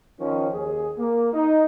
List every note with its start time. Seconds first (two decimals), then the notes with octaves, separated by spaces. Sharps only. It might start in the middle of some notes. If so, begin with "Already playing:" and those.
0.20 D#3 F3 C#4
0.54 D#2 G#4
0.99 A#3
1.33 D#4